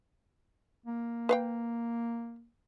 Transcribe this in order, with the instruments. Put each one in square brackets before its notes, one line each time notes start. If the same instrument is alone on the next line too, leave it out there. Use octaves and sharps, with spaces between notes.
[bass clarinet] A#3
[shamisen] B4 F5 G5